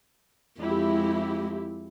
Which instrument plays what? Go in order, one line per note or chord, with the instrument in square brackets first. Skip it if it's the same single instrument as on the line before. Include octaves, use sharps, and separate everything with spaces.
[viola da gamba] F2 G#3 [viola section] E4 G4